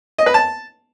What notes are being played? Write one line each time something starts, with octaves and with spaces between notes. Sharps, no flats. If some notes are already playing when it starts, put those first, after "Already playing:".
D#5
B4
A5